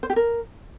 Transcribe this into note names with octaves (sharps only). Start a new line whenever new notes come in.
C5
G4
A#4